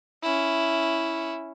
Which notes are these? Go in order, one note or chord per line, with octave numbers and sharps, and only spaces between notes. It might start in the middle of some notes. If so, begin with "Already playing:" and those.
C#4 E4